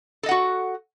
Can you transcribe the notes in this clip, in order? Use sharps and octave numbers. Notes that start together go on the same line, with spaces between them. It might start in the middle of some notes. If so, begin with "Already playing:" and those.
F#4 A4 D#5 F#5